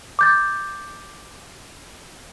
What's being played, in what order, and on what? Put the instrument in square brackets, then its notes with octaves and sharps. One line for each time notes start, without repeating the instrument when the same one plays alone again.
[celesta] D6 G6 A6